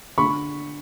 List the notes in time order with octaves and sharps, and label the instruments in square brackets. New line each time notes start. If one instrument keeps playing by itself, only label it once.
[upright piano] D3 B5 C#6